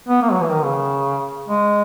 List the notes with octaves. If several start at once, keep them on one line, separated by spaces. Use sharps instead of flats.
B3
A#3
F#3
E3
D#3
C#3
G#3